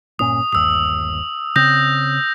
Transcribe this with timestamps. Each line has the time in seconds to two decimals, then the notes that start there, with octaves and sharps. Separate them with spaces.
0.19 G1 A#2 C#4 D#6
0.53 G1 D#2 D#6 E6
1.56 C#3 C4 D#6 G6 A#6